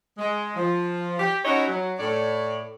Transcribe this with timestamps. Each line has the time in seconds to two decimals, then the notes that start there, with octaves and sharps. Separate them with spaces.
0.18 G#3
0.56 F3
1.20 G4
1.45 C#4 D#4 E4 F#4 C#5 D#5
1.68 F#3
1.99 A2 C#5 D5